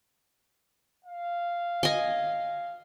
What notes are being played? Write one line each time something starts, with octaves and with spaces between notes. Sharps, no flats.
F5
D#5 G#5